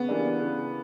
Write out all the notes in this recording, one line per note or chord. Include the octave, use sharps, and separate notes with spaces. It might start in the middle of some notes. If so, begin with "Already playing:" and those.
Already playing: C#3 B3
E3 G3 A#3 D4
C#3